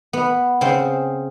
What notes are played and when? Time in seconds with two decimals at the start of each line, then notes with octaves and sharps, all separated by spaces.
0.13 B3
0.61 C#3 C4 C5